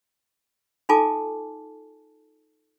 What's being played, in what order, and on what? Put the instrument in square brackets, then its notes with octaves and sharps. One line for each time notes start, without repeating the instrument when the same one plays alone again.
[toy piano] D#4 F4 A4 G#5 A5 D6